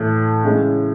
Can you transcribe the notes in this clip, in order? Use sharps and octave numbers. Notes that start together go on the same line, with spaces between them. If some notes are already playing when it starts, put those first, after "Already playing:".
Already playing: A2 E3 A3
C#3 E3 G#3 C#4